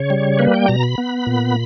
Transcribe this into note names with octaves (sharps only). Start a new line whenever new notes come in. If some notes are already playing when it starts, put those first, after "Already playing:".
Already playing: C#3 C#5
G3
A#3 B4
G5
B2 A#5
B5
B3
A#2